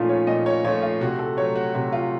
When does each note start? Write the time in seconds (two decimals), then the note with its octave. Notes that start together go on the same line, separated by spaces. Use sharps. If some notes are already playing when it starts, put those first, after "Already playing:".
Already playing: A#2 F3 A3 C#4 D#4 F4
0.09 C#5
0.27 A#2 D#5
0.46 C#5
0.64 F3 A3 C#5
0.82 F4
1.01 C3 F#4
1.19 A4
1.37 F#3 A3 C#5
1.55 F#4
1.75 C3 F#4
1.92 F4